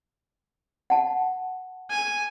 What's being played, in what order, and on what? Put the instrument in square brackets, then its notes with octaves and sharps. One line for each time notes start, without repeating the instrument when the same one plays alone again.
[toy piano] F#5 A5
[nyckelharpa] G#5